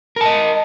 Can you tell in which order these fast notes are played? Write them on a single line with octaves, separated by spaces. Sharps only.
A#4 A5 D#5